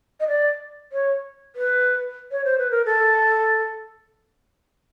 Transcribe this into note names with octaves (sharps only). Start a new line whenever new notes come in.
D#5
D5
C#5
B4
C#5
C5
B4
A#4
A4